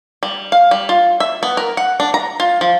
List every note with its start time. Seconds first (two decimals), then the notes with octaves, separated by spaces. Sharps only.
0.23 G3
0.52 F5
0.71 G3
0.89 F4
1.20 E5
1.43 B3
1.57 A#4
1.77 F#5
2.00 D4
2.14 A#5
2.40 F4
2.61 F3